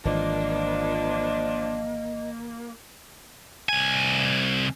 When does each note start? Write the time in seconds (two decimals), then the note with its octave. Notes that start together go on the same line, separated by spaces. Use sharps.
0.05 G#1 E3 F3 A#3 D4 D#5
3.69 C2 G#5